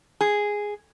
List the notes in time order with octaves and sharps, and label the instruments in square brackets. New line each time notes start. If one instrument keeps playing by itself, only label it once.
[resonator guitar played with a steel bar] G#4